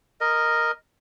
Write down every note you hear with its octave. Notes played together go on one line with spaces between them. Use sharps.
A#4 D#5